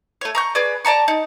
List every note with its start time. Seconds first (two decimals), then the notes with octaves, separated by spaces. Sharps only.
0.21 A3 C#5
0.35 A#5 C#6 G6
0.55 G#4 B4 D5
0.85 D5 A5 A#5 C#6
1.08 D#4